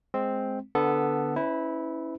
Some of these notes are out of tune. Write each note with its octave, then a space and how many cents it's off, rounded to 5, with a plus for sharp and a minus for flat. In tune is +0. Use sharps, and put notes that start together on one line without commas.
G#3 +5 C4 +0
D3 +0 B3 +0 A4 +0
C#4 +0 E4 -15 B4 +35